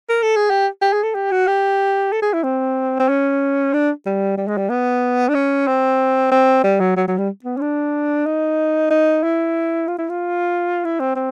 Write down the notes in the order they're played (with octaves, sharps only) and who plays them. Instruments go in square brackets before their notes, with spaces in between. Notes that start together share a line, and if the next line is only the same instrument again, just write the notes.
[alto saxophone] A#4
A4
G#4
G4
G4
G#4
A4
G4
F#4
G4
A4
G#4
E4
C4
C4
C#4
D4
G3
G3
G#3
G3
B3
D4
C#4
C4
C4
G3
F#3
F#3
F#3
G3
B3
C#4
D4
D#4
D#4
E4
F4
E4
F4
E4
C4
C4